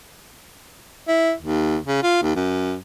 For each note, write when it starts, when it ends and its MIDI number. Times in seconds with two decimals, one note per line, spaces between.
1.08 1.33 64
1.42 1.77 39
1.86 2.02 49
2.03 2.21 65
2.22 2.32 39
2.36 2.76 42